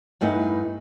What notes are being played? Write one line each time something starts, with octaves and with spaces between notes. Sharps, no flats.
E2 G2 A3 B3 D#4